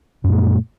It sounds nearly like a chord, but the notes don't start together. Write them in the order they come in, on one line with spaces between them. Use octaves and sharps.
F#2 A#2 A3